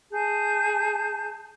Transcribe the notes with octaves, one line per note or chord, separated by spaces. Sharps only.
G#4 A5 G6